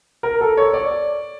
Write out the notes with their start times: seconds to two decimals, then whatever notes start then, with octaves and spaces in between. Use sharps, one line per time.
0.23 A#4
0.41 A4
0.57 C#5
0.74 D5